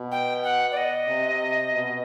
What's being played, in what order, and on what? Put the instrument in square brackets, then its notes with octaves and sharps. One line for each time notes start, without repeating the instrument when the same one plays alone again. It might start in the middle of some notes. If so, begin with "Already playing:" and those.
Already playing: [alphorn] B2
[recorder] G5
F#5
D5
D#5
[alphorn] C3
B2